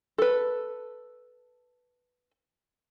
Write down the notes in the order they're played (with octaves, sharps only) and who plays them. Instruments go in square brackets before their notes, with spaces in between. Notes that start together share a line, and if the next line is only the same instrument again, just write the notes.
[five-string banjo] A4 B4